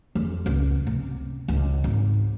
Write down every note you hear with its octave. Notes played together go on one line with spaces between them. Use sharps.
F2
C#2
C3
C#2
G#1